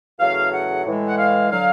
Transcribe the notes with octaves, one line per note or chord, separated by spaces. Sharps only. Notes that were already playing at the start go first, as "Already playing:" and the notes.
E2 C#3 F#3 A3 F5
F#5
A2 E3 G#3
F#5
F5
D3 F#3 F5